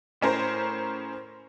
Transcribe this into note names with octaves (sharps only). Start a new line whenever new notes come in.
A2 C#4 A#4 C5